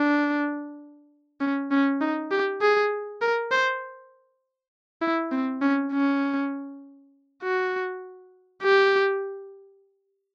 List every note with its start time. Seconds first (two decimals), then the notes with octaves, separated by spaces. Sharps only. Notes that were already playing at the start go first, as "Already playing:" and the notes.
Already playing: D4
1.41 C#4
1.71 C#4
2.01 D#4
2.31 G4
2.61 G#4
3.21 A#4
3.51 C5
5.02 E4
5.32 C4
5.62 C#4
5.92 C#4
7.43 F#4
8.63 G4